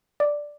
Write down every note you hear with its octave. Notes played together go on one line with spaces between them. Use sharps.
D5